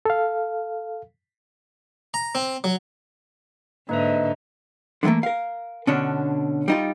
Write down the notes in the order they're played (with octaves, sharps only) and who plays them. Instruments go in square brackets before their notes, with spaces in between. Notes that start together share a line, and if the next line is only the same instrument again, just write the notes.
[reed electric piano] A4 F5
[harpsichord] A#5
C4
F#3
[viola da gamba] G#2 D3 [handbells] A#3 B4 E5 [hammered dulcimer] D#4
[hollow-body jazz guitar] D3 E3 F#3 A3 A#3
A#4 F5
B2 D3 C#4 D4
G3 D#4 F4